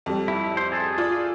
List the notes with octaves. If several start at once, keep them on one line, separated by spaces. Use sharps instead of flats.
F2 G3
E4
C5
G#4 A4
F4 D5